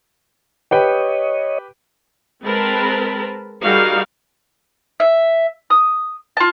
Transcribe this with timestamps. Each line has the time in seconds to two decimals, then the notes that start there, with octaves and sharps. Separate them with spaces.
0.71 G4 B4 C#5 D#5 G5
2.44 G#3 C4 A#4 B4 A5 B5
3.64 G3 D#4 F#4 G#4 A#4 F5
5.00 E5
5.70 D#6
6.37 F4 A5